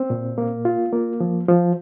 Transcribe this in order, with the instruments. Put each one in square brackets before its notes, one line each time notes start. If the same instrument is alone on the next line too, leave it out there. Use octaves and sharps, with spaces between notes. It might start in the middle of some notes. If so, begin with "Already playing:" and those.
Already playing: [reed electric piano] C4
A#2
A#3
F4
A#3
F3
F3